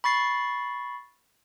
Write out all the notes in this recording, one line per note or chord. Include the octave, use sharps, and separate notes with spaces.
B5 C#6 A6 C7